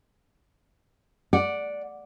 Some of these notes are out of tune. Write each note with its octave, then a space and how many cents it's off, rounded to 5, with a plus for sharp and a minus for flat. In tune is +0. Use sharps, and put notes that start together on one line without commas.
D5 +0 F#5 -10